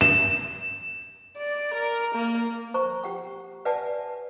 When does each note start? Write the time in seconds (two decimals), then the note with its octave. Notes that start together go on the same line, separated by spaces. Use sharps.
0.01 E7
1.37 D5
1.74 A#4
2.14 A#3
2.74 C5 A#5 C#6
3.03 G4 F#5 G5 C#6
3.65 B4 D5 E5 F#5 G#5 A5